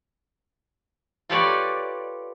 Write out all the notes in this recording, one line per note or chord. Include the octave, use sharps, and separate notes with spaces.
F4 G4 A4 B4 C#5 D5